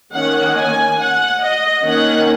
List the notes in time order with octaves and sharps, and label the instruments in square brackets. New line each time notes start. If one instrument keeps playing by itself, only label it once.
[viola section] D#3 A#3 C#4 F#5
G#5
F#5
D#5
D#3 A#3 C#4 F#5